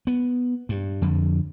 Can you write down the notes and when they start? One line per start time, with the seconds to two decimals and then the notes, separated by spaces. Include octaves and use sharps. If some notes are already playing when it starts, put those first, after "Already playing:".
0.07 B3
0.69 G2
1.02 F2 D3